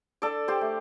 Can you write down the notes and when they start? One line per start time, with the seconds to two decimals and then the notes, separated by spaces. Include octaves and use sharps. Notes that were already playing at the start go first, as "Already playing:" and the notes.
0.22 D4 A4 D5
0.48 G4 C5
0.61 A3